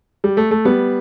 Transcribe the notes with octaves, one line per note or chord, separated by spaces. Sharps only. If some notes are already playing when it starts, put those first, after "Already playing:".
G3
A3
A3
G3 B3